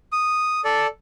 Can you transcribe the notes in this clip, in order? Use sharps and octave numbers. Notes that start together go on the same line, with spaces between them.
D#6
A4 D5